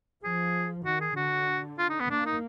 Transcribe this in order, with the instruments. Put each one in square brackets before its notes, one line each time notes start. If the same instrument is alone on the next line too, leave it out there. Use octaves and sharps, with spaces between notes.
[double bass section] F3 [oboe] G#4
[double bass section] D#3 [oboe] F#4
[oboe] G#4
[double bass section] D3 [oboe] F#4
[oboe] F4
D#4
B3
[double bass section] A#3 [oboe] D4
[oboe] D#4